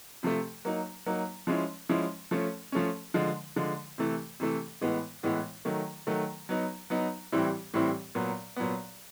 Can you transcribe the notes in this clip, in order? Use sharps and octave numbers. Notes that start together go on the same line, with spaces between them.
C3 F3 A3
F#3 A#3 D#4
F#3 A#3 D#4
F3 G#3 C#4 E4
F3 G#3 C#4 E4
F3 A3 C#4
F3 A3 C#4
D3 F3 G#3
D3 F3 G#3
C3 E3 A3
C3 E3 A3
A2 E3 G#3 B3
A2 E3 G#3 B3
D#3 F#3 A3
D#3 F#3 A3
F#3 B3 D#4
F#3 B3 D#4
A2 E3 G3 C4 E4
A2 E3 G3 C4 E4
A#2 F#3 B3
A#2 F#3 B3